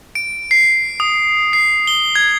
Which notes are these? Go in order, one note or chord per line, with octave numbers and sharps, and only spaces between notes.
D7
C7
D#6
C7
G7
G#6